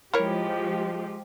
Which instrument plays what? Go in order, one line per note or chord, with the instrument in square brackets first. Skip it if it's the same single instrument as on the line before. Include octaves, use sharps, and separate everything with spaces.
[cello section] F3 G#3 G4 [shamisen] E4 A#4 C#5